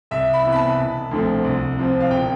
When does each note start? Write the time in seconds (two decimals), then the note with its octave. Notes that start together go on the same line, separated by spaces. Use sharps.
0.11 C2 E5
0.33 B5
0.45 C3 E3 B3
0.52 B5
0.56 A5
0.78 E1
1.11 D2 D3 F3 C4
1.44 C2
1.78 C3 F3 C4
2.00 F5
2.11 E1 G5